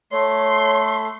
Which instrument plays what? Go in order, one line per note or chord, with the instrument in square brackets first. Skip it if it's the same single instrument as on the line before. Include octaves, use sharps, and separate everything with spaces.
[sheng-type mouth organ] A3 [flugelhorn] C#5 [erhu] C6